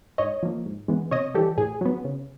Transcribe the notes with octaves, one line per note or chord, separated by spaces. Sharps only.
G#2 C#5 D#5
F3 A#3
G#2
E3 G#3 B3
C3 C#5 D#5
E3 G3 G4 A4
A2 G#4
F#3 B3
C#3